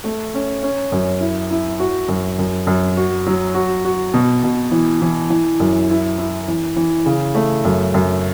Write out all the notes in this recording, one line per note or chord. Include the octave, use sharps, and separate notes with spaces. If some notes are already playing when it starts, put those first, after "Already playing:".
A3
C#4
C#4
F#2
E4
E4
F#4
F#2
F#2
F#2
F#4
F#3
F#4
F#4
B2
B2
E3
E3
E3
F#2
E4
E4
E3
E3
C#3
A3
F#2
F#2